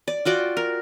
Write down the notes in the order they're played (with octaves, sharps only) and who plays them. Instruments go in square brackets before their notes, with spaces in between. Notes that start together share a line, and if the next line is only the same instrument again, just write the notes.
[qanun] D5
F4 F#4 D5 G5
A#4